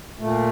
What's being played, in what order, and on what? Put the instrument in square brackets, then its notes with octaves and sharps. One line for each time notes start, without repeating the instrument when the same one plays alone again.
[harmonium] A#2 A3